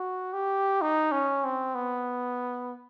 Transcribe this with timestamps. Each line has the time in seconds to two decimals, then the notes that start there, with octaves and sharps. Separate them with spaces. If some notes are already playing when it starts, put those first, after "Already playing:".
Already playing: F#4
0.33 G4
0.81 D#4
1.12 C#4
1.44 C4
1.75 B3